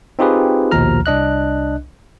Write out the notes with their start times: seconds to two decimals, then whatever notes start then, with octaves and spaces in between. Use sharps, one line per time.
0.19 C4 D#4 F4 G4 G#4 B4
0.71 A#1 D#2 B2 F3 A#5 F6
1.06 C2 D4 D#5 F#6